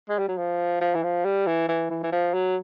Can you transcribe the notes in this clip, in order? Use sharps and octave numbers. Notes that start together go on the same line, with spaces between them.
G#3
G3
F#3
F3
F3
E3
F3
G3
E3
E3
E3
E3
F3
F#3